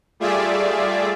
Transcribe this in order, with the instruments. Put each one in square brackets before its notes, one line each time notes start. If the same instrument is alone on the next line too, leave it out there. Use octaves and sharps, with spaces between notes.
[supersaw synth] G3 A3 F4 G#4 D5 E5